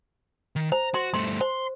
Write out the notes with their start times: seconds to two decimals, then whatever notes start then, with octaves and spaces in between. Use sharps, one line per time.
0.56 D#3
0.72 C5 A#5
0.94 F#4 C6
1.14 G2 A3 C6
1.41 C5 C6